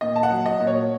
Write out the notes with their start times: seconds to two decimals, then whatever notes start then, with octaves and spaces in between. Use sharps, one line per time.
0.01 A#2 D#5
0.16 A5
0.23 F#5
0.30 F#3
0.46 D#5
0.60 A#2
0.67 C#5